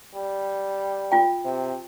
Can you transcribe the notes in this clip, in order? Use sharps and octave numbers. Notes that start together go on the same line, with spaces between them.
G3
F4 G5
C3